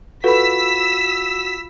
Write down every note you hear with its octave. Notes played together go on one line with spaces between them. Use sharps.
F4 F#4 A4 B4 B5 E6 B6